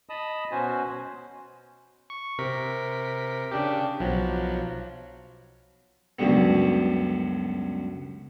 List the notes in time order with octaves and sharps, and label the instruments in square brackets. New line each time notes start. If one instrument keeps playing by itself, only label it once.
[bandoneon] D#5 A5 B5 D#6
B2 C#4 F#4 C5 G#5
[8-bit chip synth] C#6
C3 A#4 B6
C#3 D4 G4
B1 F3 F#3
[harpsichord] C#2 F#2 B2 D3 G3 B3